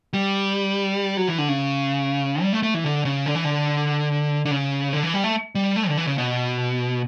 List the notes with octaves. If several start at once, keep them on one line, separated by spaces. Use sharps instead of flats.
G3
F#3
E3
D3
C#3
G3
A3
A3
E3
D3
C#3
D3
E3
D3
D3
C#3
D3
E3
G3
A3
G3
A3
D3
E3
C#3
B2